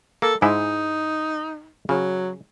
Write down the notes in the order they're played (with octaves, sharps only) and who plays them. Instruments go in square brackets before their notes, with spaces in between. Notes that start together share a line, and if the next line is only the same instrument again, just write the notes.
[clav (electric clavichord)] A#3 [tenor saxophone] A4
[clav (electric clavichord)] G#2 G#3 E4 [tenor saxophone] D#4
[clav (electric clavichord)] C#3 [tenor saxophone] F#3